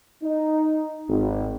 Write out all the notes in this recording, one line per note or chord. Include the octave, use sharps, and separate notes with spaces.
D#4
G#1